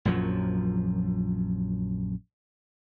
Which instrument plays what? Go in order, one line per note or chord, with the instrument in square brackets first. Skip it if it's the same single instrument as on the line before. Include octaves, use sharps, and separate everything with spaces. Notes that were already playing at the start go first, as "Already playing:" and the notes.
[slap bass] A#1 F#2 F3 F#3